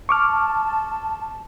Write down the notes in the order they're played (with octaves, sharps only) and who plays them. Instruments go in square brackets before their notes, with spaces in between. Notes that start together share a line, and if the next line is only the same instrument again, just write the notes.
[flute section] A5 [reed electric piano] C#6 D6 F6